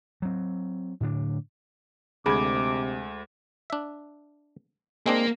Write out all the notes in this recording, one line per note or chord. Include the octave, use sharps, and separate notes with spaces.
F#3 C4
A2 D3 C#4 D4
D2 C3 G#3 G#4 B5 D6 G#6
D4 E5
G#3 A#3 C4 D4